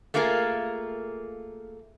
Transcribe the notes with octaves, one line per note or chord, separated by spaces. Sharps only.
A3 A#3 F4 G#4 A#4